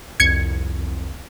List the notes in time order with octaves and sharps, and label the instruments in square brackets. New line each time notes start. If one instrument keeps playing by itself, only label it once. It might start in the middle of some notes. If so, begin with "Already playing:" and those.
[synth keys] C2 F2 [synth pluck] G#6 C#7